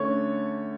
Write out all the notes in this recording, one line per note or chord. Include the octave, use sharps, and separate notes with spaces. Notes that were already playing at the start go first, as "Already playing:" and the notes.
Already playing: D3 A3 C#4 C#5